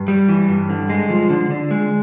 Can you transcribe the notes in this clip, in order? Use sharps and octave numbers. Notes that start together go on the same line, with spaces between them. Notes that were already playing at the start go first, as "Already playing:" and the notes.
Already playing: G2
G3
E3
G2
D3
G#3
F3
D3
D3
G#3